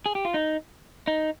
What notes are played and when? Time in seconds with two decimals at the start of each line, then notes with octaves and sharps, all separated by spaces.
0.06 G#4
0.15 G4
0.25 F4
0.34 D#4
1.07 D#4